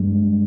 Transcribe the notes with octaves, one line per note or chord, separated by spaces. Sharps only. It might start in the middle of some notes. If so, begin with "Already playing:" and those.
Already playing: G2 G#3